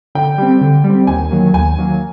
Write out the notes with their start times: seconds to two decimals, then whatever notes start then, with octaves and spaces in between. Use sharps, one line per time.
0.15 D3 G5
0.38 G3 C4
0.61 D3
0.84 G3
0.89 C4
1.07 D#2 G#5
1.31 D#3 F#3 A#3
1.54 D#2 G#5
1.77 D#3 F#3 A#3